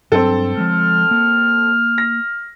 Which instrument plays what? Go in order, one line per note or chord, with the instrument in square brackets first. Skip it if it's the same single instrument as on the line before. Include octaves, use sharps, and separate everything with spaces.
[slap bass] G2 F#3 D4 [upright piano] C4 A4
[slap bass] F3 G#3 [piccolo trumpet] F6
[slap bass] A#3
[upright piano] A#6